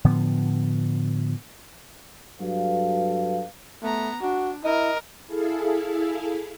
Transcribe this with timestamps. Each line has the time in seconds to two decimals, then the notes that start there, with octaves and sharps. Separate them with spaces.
0.05 A2 D3 F3 B3
2.40 G2 F#3 A4 B4 F5
3.82 A3 B3 A#5
4.22 D4 F#4
4.64 E4 A#4 D#5
5.27 E4 G#4 A4 F5